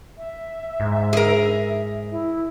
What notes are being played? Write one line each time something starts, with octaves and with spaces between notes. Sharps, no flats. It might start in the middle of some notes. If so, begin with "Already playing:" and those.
E5
G#2
G#4 A#4
E4